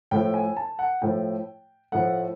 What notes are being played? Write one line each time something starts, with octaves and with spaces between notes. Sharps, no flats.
A2 F3 A3 G5
G#5
A5
F#5
A2 F3 A3 G5
A2 F3 A3 F#5